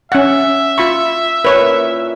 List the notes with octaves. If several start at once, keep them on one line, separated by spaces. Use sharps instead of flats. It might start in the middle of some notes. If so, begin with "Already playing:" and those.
C#4 E5 F#5
F4 B5 C#6
A#2 C#4 E4 B4 C#5